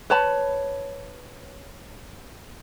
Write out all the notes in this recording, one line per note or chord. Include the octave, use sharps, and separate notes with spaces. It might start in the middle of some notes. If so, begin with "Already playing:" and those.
B4 C#5 A5 B5